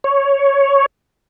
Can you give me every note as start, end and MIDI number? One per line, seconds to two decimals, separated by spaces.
0.04 0.86 73